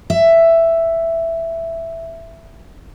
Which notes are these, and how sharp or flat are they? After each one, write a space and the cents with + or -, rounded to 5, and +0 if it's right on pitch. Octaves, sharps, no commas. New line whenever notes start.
E5 +5